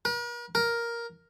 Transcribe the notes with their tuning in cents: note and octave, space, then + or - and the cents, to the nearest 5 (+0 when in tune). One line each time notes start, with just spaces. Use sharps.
A#4 +45
A#4 +5